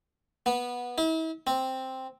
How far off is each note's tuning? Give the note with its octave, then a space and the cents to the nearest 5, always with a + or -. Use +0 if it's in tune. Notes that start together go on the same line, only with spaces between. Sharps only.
B3 -15
E4 -40
C4 +0